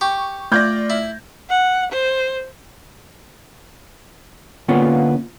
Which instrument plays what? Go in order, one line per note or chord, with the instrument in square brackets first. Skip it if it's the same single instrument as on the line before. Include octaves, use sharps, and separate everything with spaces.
[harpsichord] G4 [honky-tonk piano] C#6
[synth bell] A3 [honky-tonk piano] F4 D5 A#6 [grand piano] D6 G6 G#6
[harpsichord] E4
[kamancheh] F#5
C5
[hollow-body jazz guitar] D3 A#3 B3 C#4 F4